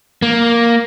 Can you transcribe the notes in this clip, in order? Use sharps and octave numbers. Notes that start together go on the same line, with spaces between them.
A#3